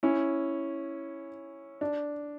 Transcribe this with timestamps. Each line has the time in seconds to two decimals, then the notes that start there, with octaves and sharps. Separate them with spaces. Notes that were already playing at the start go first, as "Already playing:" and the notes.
0.03 C#4 E4
1.81 D4